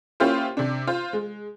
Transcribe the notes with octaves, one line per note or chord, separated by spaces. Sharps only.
A#3 C#4 E4 F4 G4 C5
C3 D4
F4 C5
G#3